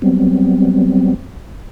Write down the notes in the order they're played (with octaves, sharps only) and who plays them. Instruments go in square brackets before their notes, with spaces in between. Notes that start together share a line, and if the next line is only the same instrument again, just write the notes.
[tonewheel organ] F#3 G3 B3 C4